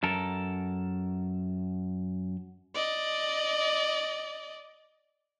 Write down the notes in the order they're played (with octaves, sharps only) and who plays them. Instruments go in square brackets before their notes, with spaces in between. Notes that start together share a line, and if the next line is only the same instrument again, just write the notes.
[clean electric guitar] F#2 A4 A#4
[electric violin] D5 D#5